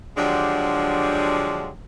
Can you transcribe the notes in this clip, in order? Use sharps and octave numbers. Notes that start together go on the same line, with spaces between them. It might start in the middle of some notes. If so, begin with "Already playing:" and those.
D3 F3 F#3 G#3 D4 G4